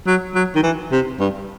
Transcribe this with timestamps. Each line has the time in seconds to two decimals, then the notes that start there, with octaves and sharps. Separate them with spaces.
0.07 F#3
0.35 F#3
0.56 D#3
0.63 E3
0.91 C3
1.19 G2